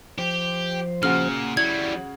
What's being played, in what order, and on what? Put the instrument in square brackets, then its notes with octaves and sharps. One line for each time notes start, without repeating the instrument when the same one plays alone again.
[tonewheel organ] F3 C5 [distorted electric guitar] G4
[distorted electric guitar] A#2 [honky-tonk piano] C#3 F#4 [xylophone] F6
[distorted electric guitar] F#3 G3 [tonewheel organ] E4 D5 [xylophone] G#6